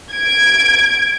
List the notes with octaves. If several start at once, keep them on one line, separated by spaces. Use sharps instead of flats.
G#6 D7